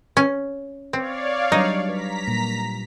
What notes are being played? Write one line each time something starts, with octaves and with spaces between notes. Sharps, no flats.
C#4
C4 C#5 D5 F5
F#3 G3 D4 D#4
B4 A#5 B6
A#2 G3 A#3